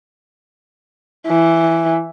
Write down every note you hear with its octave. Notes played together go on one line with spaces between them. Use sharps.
E3